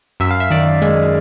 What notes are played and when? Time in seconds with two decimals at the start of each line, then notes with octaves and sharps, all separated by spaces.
0.20 F#2 E5
0.31 F5
0.40 E5
0.51 D#3 D5
0.82 G#3